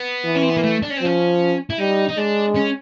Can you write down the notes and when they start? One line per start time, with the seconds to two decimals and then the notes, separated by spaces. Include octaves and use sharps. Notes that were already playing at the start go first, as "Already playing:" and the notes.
Already playing: B3
0.25 E3
0.35 C#4
0.42 C4
0.49 B3
0.56 A#3
0.63 A3
0.82 D4
0.90 C#4
0.97 C4
1.02 F3 C#4
1.70 E4
1.78 G3 D#4
2.09 D#4
2.17 G#3 D4
2.56 C#4